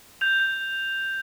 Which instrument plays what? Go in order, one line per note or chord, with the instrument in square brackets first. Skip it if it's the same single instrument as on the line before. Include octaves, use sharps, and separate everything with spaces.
[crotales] G6 F7
G6